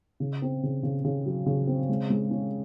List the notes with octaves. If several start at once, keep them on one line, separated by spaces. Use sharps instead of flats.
C#3
C4
C#3
C#3
C#3
F#3
C#3
C4
G#3
G#3
C#4